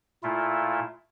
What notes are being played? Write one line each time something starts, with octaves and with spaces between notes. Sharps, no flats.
A#2 A3 E4 F4